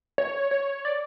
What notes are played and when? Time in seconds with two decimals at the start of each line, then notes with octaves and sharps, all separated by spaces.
0.18 C#5
0.51 C#5
0.85 D5